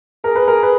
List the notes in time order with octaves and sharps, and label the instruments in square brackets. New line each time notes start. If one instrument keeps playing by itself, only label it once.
[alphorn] G#4 [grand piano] A#4
[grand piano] B4
A#4
B4